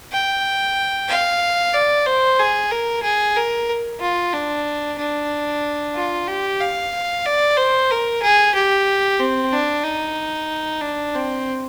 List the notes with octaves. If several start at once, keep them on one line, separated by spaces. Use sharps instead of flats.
G5
F5
D5
C5
G#4
A#4
G#4
A#4
F4
D4
D4
F4
G4
F5
D5
C5
A#4
G#4
G4
C4
D4
D#4
D4
C4